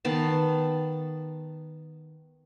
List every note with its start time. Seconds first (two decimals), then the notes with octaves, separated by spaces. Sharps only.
0.05 D#3 B3 F5 A5